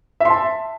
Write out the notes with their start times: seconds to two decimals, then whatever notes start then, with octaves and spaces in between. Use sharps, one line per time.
0.20 E5
0.25 C6
0.30 A5